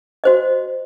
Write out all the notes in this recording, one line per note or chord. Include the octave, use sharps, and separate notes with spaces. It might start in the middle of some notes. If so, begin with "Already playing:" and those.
F#4 C5 D#5